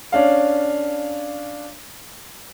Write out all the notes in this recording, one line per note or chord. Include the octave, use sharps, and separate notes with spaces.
C#4 D4 F5